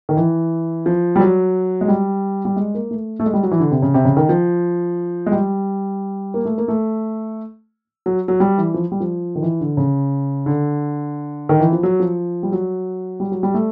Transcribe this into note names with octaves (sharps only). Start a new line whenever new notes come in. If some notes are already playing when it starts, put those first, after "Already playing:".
D#3
E3
F3
G3
F#3
G#3
G3
G3
G#3
A#3
A3
A3
G#3
G3
F#3
E3
D3
C3
C#3
C3
C#3
D#3
F3
G#3
G3
A#3
A3
A#3
A3
F#3
F#3
G3
E3
F3
G3
F3
D#3
E3
D3
C#3
D3
D#3
E3
F3
F#3
F3
G3
F#3
G3
F#3
G3
A3